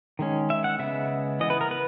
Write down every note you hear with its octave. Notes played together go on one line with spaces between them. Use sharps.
D#3 G#3 C#4
E5
F#5
C#3 G#3 B3 E5
E3 B3 D#5
B4
A#4
B4